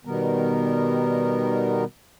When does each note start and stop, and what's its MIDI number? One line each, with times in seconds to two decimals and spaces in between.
0.05 1.84 47
0.05 1.84 51
0.05 1.84 55
0.05 1.84 59
0.05 1.84 70